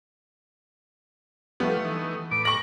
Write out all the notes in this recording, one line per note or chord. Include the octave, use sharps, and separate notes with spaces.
F3 G3 A3 B3
E3 D#4
A2 B4 D6 D7
C#6 A#6 F#7